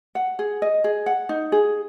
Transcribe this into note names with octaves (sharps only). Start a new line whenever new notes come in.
F#5
G#4
D#5
G#4
F#5
D#4
G#4